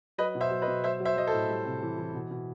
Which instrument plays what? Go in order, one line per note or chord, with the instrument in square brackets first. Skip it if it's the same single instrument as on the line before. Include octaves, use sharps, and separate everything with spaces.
[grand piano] F#3 B4 D#5
B2
C5 E5
F#3
B4 D#5
B2
F#3 C5 E5
F#3
C5 E5
F#3 D#5
A4 C5
A2
G3
C3
E3
E3
B2
B2